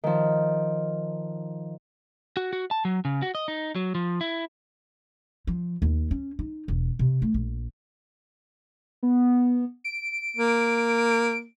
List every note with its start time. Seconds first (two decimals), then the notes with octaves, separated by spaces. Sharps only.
0.04 D#3 F3
2.37 F#4
2.53 F#4
2.71 A5
2.85 F#3
3.05 C#3
3.22 F#4
3.35 D#5
3.48 D#4
3.75 F#3
3.95 F3
4.21 E4
5.47 F3
5.82 D#2
6.11 C#4
6.39 D#4
6.68 E1
6.99 C3
7.22 A3
7.34 A#1
9.03 B3
9.84 D7
10.37 A#3